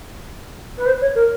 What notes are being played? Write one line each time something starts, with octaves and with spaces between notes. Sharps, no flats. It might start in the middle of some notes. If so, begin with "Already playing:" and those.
B4
C5
C#5
A#4